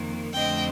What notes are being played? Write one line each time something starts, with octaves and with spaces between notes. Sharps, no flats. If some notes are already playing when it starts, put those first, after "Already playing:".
Already playing: F2 D#3 A#3
F2 D3 A3 C4 D#5 G5